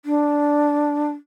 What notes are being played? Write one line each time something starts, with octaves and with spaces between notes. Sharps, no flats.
D4